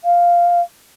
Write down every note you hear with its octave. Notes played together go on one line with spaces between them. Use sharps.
F5